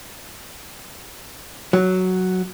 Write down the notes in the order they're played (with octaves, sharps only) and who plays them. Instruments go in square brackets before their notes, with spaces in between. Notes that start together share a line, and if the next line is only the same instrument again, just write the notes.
[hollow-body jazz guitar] F#3